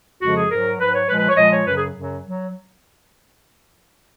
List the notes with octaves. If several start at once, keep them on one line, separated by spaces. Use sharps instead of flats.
F2 C#3 F3 G#3 F#4
G#4
G#2 F#3 A#4
G#2 F#3 B4
C#5
A#2 F3 G#3 B4
B4
C#5
A#2 F3 G#3 D#5
C#5
F#2 C#3 F#3 B4
G#4
F#2 C#3 F#3
F#3